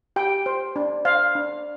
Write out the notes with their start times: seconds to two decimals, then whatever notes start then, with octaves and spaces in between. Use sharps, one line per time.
0.16 G4 G5
0.46 C5
0.76 D4
1.05 C5 F5
1.35 D4